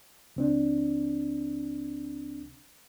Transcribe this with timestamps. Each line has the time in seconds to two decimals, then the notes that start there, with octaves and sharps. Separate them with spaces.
0.36 C#2 C4 D4